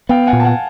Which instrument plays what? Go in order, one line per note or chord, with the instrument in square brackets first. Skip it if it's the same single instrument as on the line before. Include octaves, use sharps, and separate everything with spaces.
[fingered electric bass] B3 [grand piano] F5 G5
[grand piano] F#5 G#5
[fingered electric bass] A#2
[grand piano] A5
F#5 G#5